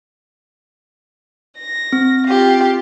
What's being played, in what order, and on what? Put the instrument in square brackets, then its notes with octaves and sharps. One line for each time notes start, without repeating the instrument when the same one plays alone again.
[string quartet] A#6
[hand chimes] C4
[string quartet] F4 G4 F5